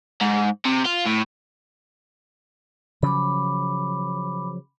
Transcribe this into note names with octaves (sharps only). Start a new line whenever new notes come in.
G#2
C3
F4
A2
C#3 F3 F#3 B5 D6